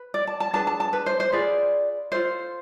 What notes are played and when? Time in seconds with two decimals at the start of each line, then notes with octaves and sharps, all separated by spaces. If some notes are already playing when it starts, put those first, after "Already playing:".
Already playing: B4
0.14 D5
0.27 A5
0.40 A5
0.53 D4 G#4 B4 A5
0.67 A5
0.80 A5
0.93 B4
1.06 C5
1.20 C5
1.32 F4 G#4 B4 D5
2.12 F4 A4 C5